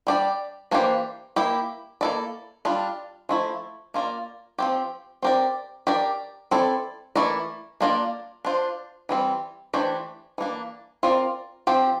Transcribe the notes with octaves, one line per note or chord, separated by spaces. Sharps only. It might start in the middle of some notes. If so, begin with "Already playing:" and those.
G3 D4 G4 D5
E3 A#3 D4 G4 C5
A#3 E4 G4
A#3 E4 A4 D5
G3 D4 F4
F3 A3 E4
A#3 F4 A#4 D5
F3 C4 G4
C4 G4 A#4 D5
D4 G4 A#4 D5
C4 E4 A4 D5
E3 A3 E4 A#4 D5
A#3 D4 F4 A#4 D5
D4 F4 C5
E3 G3 C4
E3 A3 D4 G4 C5
E3 A#3 D4
C4 F4 A#4 D5
F3 C4 G4